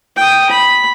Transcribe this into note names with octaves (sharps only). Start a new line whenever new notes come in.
G5 D#6
B5